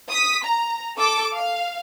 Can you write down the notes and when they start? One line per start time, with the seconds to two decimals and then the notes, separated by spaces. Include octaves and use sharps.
0.10 D#6 B6
0.43 A#5
0.97 A4 D6
1.34 F5